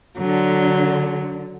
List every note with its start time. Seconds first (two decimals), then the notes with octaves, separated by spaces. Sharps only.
0.19 D3 F#3